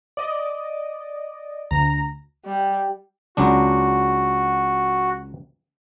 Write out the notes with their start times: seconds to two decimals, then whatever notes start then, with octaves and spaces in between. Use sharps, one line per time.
0.17 D5 D#5
1.71 D2 A#5
2.45 G3
3.37 C#2 F#3 D4 F#4